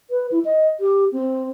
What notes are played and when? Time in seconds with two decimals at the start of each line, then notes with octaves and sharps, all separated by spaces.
0.11 B4
0.32 E4
0.45 D#5
0.80 G4
1.12 C4